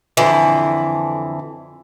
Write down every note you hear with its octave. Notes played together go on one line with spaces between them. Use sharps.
F2 D3 E3